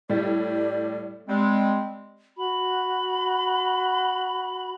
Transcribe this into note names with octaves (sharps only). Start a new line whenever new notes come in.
A2 G3 D5
G3 G#3 C4
F#4 B5